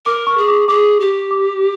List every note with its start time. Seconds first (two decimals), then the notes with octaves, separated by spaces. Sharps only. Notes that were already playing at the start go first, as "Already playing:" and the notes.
0.06 A#4 D6
0.27 C#6
0.37 G#4
0.48 D6
0.68 G#4 D6
1.00 G4
1.31 D6